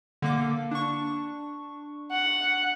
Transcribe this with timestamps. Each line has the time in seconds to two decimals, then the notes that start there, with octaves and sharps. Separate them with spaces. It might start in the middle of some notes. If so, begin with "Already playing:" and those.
0.22 D3 A#3 D6
0.71 D4 C#6
2.12 F#5